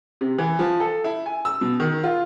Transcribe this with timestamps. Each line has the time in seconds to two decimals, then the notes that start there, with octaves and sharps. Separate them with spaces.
0.21 C3
0.38 E3
0.59 F3
0.80 A4
1.04 E4
1.26 G#5
1.45 E6
1.61 B2
1.80 D#3
2.04 F4